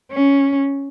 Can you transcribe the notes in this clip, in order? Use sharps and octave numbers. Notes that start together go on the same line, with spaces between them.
C#4